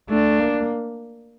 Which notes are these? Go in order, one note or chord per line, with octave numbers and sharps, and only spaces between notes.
A3 D4
A#3